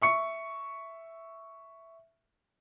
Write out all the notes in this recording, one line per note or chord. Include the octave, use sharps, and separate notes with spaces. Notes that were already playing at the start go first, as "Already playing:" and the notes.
E5 C#6 C#7